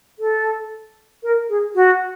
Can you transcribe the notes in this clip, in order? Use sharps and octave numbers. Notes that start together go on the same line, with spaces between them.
A4
A#4
G#4
F#4